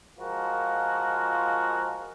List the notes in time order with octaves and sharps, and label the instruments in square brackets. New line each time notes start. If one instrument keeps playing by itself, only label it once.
[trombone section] F3 G#3 F4 F#4 A#4